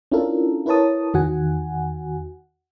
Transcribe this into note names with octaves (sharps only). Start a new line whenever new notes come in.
C#4 D4 E4 F4 A4 A#4
E4 A#4 B4 C#5 A5 D#6
E2 D#3 F#4 F#5 G#5